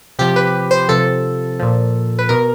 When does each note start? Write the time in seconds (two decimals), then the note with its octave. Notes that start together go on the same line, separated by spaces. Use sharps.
0.19 C3 F3 G4
0.36 B4
0.71 C5
0.89 C3 F3 A4
1.60 A#2 F3
2.19 B4
2.29 B2 A#4